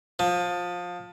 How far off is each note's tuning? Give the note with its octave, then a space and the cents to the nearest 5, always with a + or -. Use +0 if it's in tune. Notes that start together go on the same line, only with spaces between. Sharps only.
F3 +20